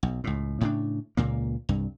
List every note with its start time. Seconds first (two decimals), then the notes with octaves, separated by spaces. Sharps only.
0.03 B1
0.24 C#2 A2
0.61 A2 C#3 D4
1.17 C#2 A#2 A#3
1.69 C2 G2